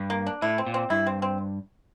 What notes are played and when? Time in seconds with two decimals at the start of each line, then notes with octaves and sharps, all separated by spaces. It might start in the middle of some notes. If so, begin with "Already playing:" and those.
Already playing: G2
0.10 A#3
0.27 D4
0.42 A2 E4
0.58 C4
0.66 A#2
0.74 C4
0.90 G2 E4
1.07 C4
1.22 C4